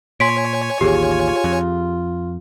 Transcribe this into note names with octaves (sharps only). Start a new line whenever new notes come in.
A#2 C#5 G#5 C6 B6 D7
A1 D#2 F4 G4 G#4
F2